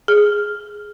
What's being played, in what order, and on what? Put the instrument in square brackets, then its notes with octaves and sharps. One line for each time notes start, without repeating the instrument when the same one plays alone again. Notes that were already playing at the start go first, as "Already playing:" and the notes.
[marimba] G#4